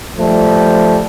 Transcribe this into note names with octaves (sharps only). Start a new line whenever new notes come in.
F3 G3 A3